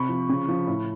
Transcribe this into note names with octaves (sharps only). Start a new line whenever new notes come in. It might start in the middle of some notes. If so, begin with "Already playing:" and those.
Already playing: C3 B5 C#6
F3
C#3
F3
A2